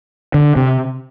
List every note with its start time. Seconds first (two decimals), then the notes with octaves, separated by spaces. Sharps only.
0.34 D3
0.56 C3